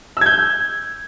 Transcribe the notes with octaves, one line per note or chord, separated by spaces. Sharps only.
E6 G6 G#6